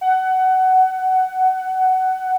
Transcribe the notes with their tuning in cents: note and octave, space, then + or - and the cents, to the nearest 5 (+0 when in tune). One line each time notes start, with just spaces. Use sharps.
F#5 +20